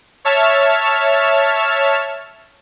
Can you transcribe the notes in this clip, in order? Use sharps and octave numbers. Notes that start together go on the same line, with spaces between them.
C#5 E5 A5 F6